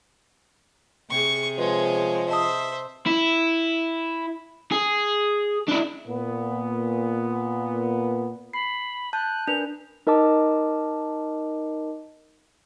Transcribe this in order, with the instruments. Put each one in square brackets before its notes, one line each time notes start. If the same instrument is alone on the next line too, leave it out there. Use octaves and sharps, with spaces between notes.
[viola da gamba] C3 G#4 [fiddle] C#6
[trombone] F3 [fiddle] G#3 C#5 [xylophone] B4
[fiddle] C5 E5 [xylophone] D#5 A5 D#6
[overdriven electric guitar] E4
G#4
D4 E4
[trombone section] A#2 B3
[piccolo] B5 [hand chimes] C7
[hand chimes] A5 G6 [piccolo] F#6
[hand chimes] D4 A#4 B4 [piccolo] F7
[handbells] D#4 A#4 D#5 A5 D6